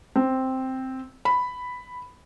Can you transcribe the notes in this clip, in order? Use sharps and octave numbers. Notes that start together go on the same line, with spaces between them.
C4
B5